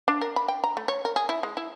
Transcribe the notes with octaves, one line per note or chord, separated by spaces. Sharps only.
D4
A#4
B5
G5
A#5
A3
C#5
A#4
G#4
E4
G#3
E4